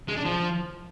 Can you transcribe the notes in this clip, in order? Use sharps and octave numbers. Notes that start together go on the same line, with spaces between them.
G#3
D4
F3